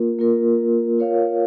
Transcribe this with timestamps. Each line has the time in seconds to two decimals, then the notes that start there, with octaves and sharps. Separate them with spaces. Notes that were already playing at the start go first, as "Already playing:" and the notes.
Already playing: A#3 F4 A#4
0.19 A#3 F4 A#4
0.98 F4 A#4 C#5 F5